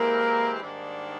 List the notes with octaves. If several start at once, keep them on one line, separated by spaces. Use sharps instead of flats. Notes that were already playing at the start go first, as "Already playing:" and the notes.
Already playing: E3 G#3 A#3 C4 E4 G4 A#4
G#2 D#3 G3 A#3 D4